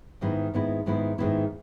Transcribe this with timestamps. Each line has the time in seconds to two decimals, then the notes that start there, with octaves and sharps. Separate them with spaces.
0.21 G#2 D#3 G#3 B3 E4
0.54 G#2 D#3 G#3 B3 E4
0.86 G#2 D#3 G#3 B3 E4
1.18 G#2 D#3 G#3 B3 E4